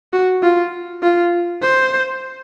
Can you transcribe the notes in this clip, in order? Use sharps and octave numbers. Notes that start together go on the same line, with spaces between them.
F#4
F4
F4
C5